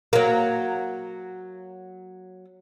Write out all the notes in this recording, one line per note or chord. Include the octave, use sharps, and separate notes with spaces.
F#3 A#3